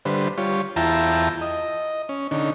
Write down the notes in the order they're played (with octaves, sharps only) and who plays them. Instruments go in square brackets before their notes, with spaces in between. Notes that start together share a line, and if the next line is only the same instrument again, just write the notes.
[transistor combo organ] D3 G3 B4 C5
G3 F4 C#5
E2 E4 F4 G5 A5 A#5
D#5
C#4
D3 C#4 D#4